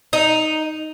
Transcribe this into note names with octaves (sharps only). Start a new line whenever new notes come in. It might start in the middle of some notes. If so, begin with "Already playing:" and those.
D#4